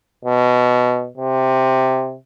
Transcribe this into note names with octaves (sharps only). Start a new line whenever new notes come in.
B2
C3